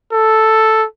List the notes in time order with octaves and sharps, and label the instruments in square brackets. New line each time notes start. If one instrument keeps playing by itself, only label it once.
[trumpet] A4